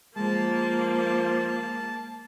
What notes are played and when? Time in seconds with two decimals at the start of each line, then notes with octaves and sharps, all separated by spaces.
0.16 F3 G#3 A#3 A5